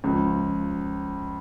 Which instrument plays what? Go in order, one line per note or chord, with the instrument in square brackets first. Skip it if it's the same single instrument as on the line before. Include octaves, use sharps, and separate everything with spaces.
[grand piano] C#2 C#3 F3